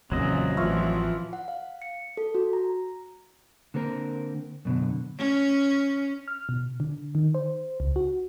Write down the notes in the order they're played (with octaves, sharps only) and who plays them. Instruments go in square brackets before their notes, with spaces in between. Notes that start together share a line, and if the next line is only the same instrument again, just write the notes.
[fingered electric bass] A#1 F2 A#2 [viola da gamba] C#3 E3 [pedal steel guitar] F#3 C4 D#5
[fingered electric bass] A1 [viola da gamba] E3 F3 [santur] F4 C#5 E5
[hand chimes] F#5
F5
C#7
A4
F#4
A#5
[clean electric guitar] D3 A#3 C4 A4 A#4
F#2 B2 D3
[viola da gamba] C#4
[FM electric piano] F6
B2
D3
D#3
C5
C#2
F#4